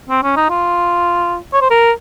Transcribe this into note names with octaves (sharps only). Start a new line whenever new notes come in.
C4
C#4
D#4
F4
C#5
C5
A#4